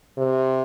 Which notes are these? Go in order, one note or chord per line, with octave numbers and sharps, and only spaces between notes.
C3